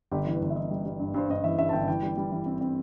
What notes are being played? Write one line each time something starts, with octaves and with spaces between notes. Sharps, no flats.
G1 G4
E3
B4
G1
E5
E3 D#5
G3
G3
G2
G2 C5
G2 D#5
E3 E5
G2 E5
A5
G1 G5
E3 G5
G3
G3
E3
C4
C4